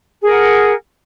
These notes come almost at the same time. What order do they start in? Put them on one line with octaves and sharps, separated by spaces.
G#4 A#4 F#5